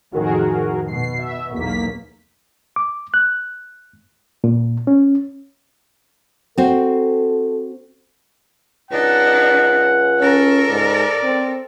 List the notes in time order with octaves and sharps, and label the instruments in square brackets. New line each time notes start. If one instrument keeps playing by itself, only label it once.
[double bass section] F2 A2 D#3 [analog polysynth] F#4 G#4 A#4
[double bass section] B2 [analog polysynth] C7
[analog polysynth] E5
[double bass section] B1 E2 [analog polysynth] A#3 B6
[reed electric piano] D6
F#6
A#2
C#4
[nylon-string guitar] C4 F#4 [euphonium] A4
[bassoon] C#2 [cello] D4 D#4 [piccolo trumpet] F#5
[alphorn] C#4 [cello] A4 A#4
[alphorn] G#2 [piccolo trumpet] D5
[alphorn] C4